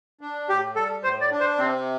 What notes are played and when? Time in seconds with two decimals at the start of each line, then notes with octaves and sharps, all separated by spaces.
0.21 D4
0.49 A2 G4
0.76 G3 A4
1.04 A2 C5
1.21 D5
1.31 D4
1.40 C5
1.59 C3 C4